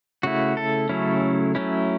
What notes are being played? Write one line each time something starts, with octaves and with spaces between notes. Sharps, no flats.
C#3 A3 E4 F#4
A4
C#3 F#3 A3 C#4 E4
F#3 A3 C#4 E4